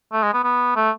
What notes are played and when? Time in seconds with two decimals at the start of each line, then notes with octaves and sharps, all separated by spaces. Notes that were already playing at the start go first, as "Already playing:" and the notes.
0.13 A3
0.23 G#3
0.34 B3
0.44 B3
0.76 A3